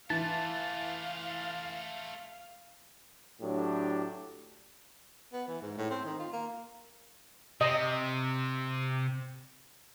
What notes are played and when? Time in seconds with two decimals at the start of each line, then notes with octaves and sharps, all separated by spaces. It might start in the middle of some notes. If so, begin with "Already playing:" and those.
0.10 E3 A3 F4 F5 A5
3.41 A2 F#3 D4 G4
5.33 B3
5.48 E3
5.62 G#2
5.78 A2
5.90 C4
6.05 D#3
6.19 F4
6.33 A#3
7.61 C3 C4 D#5